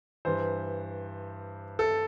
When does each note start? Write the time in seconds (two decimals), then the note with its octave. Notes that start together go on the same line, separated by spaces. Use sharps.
0.25 G2 E3 C5
1.79 A4